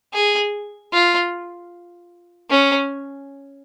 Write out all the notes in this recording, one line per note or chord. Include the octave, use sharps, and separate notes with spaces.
G#4
F4
C#4